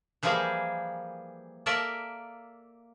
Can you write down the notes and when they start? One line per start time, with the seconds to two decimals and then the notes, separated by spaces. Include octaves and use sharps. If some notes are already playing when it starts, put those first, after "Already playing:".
0.23 E3 F3 G3 A#3 G#4
1.66 A#3 A4 A#4 D5 E5 A5